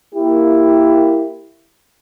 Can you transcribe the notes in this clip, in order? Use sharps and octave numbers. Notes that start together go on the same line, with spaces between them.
A#3 E4 G4